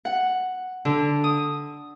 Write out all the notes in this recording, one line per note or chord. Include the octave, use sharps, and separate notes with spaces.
F#5
D3
D#6